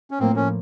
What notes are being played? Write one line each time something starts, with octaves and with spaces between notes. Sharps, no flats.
C#4
A2 F3 A#3 C4
C#4